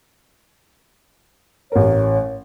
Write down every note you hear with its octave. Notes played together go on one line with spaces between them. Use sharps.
A1 A#4 C#5